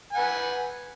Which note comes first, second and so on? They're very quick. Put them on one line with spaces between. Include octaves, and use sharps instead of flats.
G#5 F#5 B4